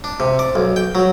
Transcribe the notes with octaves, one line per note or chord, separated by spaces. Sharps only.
D4
C3
D5
B1
G5
F#3